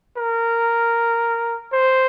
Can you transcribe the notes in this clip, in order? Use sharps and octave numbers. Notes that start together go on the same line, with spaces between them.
A#4
C5